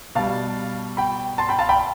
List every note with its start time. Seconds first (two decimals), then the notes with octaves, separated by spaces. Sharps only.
0.15 B2 G3 F5 A5
0.97 G5 B5
1.38 A5 C6
1.49 G5 B5
1.59 F5 A5
1.69 G5 B5